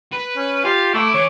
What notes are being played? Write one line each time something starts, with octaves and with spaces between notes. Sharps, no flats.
B4
C#4
F4 G4 F5
A3 E4 D6
E3 C#5